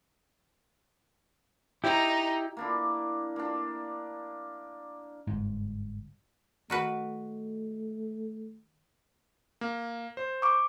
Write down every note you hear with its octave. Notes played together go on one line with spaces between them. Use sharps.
D#4 E4 G4
A#3 D4 E4
A#3 D4
G1 G#2
D#3 A3 F#4 B4
A#3
C5
C#6 D6